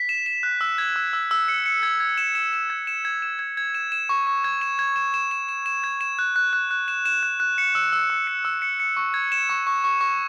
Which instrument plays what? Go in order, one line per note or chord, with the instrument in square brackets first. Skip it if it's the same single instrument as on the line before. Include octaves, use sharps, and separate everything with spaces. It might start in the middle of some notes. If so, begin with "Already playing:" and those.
Already playing: [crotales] B6
E7
E7
F#6
E6
G#6
E6
E6
E6
C#7
C#7
G#6
G#6
E7
E7
E7
G#6
E7
G#6
E7
G#6
G#6
E7
E7
C#6
C#6
G#6
E7
G#6
E7
E7
E7
E7
E7
G#6
E7
F#6
F#6
F#6
F#6
E7
E7
F#6
F#6
C#7
E6
E6
E6
C#7
E6
C#7
C#7
C#6
G#6
E7
C#6
C#6
C#6
C#6